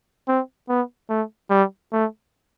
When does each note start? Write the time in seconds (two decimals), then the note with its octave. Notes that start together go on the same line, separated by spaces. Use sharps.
0.28 C4
0.69 B3
1.10 A3
1.50 G3
1.93 A3